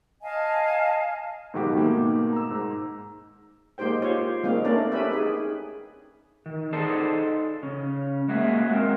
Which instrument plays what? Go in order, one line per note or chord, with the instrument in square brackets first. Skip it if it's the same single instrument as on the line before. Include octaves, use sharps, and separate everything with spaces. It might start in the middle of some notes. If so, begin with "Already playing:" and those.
[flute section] D#5 F5 G#5 A5
[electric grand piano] B1 G#2 D#3 F#4 G4 D6
G#2 B2 D#3 A3 A#3
A#5 E6
G#2 A#5
[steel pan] G#3 A#3 D#4 G4 C5 G5
F4 G4 C5 C#5
G3 G#3 A#3 C4 D#4 F5
A3 A#3 C#4 D4 A#4 D5
C4 C#4 G4 B4 E5 B5
D#4 G#4
[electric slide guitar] D#3
D#4 G#4 A4 C5 D5 A5
C#3 C#4
G#3 A#3 F#4 G#4 E5
F#3 G#3 C4 A#4